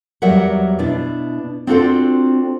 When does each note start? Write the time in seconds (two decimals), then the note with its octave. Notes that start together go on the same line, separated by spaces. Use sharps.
0.22 E2 F#3 G3 A#4 E5 F#5
0.79 B2 D4 E4
1.67 C4 D4 F4 F#4 A4 C5